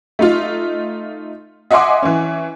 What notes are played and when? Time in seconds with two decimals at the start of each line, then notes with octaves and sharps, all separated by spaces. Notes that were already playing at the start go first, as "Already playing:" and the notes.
0.19 A3 D#4 F4
1.71 D#5 E5 F#5 G#5 C6 D6
2.03 E3 C#4